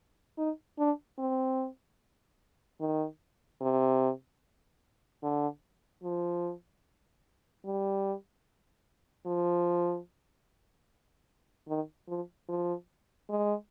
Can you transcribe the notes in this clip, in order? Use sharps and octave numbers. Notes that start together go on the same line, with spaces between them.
D#4
D4
C4
D#3
C3
D3
F3
G3
F3
D#3
F3
F3
G#3